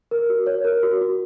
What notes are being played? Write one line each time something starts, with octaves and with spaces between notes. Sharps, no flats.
A#4
F#4
C#5
A#4
F#4
F#4